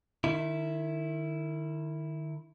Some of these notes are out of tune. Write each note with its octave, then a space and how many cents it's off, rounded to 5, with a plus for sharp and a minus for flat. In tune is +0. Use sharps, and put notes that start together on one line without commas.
D#3 -35 E4 -5